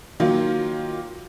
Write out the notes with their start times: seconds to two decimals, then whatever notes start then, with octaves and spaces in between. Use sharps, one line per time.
0.20 D#3 F#3 A#3 F4